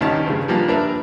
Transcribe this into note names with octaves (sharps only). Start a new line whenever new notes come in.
C2 G2 D#3 C#4 G4 A5
G2 C#3
F3 G3 A#3 B3 D4
D4 A#4 B4 E5